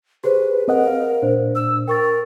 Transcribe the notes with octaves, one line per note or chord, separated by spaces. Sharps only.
G4 G#4 B4 C5
C4 A#4 D#5 F#5
F5
A#2 D4 C5
E6
A#4 G5 C#6 A6